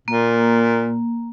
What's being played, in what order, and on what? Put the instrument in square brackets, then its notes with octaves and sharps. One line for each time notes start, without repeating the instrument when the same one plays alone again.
[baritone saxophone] A#2 [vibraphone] A#3